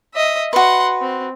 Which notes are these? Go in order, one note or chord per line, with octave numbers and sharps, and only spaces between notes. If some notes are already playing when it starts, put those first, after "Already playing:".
D#5 E5
F#4 B4 F#5 C6
C4